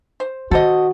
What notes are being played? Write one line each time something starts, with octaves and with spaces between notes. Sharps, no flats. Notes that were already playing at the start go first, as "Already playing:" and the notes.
C5
D#3 F#4 A4 C5 D#5